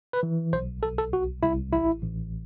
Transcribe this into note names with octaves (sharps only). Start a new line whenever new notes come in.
B4
E3
B1 C5
B1 A4
A4
C2 F#4
C2 E4
A1 E4
A1